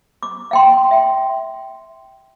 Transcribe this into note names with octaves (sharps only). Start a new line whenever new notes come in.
D6
F5 G5 C6
E5 G5